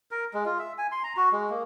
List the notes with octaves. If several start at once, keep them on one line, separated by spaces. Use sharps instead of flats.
A#4
G#3
F4
E5
G#5
C6
A#5
F#4
G#3
A#3